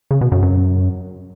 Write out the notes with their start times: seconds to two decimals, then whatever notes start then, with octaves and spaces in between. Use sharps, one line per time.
0.11 C#3
0.21 B2
0.32 F#2
0.42 F#2